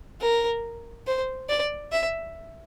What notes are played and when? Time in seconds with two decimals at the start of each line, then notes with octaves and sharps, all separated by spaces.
0.21 A#4
1.07 C5
1.49 D5
1.92 E5